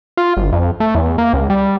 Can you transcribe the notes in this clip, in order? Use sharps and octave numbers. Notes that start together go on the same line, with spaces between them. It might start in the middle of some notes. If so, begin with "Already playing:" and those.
F4
G1
F2
A3
E2
A#3
C#2
G3